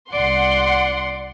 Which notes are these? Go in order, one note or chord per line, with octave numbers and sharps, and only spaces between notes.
C2 D5 F#5 C6